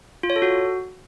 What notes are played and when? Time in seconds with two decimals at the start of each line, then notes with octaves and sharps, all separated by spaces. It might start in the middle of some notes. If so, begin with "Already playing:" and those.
0.23 F4
0.30 C#5
0.36 A4
0.42 F#4